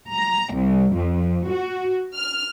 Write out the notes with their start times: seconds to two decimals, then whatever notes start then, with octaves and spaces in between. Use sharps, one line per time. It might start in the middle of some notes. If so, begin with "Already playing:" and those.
0.12 A#5
0.53 C2
0.95 F2
1.48 F#4
2.16 F6